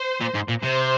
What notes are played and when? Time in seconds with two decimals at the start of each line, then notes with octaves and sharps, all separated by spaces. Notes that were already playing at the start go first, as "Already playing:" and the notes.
Already playing: C5
0.21 A#2
0.34 G#2
0.48 A#2
0.62 C3 C5